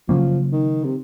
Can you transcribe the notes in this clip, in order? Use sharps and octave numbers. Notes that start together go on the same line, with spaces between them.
C#3 F3 F#3 A#3 C#4
D#3
C3